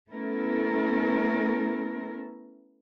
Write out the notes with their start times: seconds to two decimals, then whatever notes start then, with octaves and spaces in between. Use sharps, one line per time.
0.10 A3 B3 C#4 E4 A4 A#4